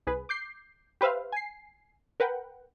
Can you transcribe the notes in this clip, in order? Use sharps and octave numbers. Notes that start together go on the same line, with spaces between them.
C2 G#4 B4
D6 G6 C7
G4 B4 C5 E5 F5
G#5 C7
A#4 B4 F#5 G5